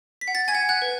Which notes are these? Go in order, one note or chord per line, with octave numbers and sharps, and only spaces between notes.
B6
F#5
A6
G#5 G#6
F#5
F#5 F#6
B4